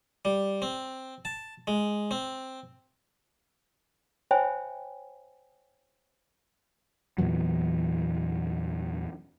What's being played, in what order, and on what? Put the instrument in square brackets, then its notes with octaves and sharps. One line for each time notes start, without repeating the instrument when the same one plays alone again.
[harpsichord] G3
C4
A5
G#3
C4
[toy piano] C5 C#5 E5 G5 G#5 B5
[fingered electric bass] E2 A#2 E3 F#3